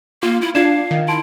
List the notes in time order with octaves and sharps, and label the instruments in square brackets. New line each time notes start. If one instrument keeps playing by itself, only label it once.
[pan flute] A#3 [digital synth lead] F4
[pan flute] E4
[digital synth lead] D4 [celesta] F4 G#6 E7 [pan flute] F5
[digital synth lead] D#3
[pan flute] E4 [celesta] A5 C6 D7